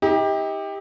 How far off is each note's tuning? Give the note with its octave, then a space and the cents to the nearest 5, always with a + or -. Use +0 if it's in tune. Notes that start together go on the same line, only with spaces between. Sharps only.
D#4 +40 G4 +20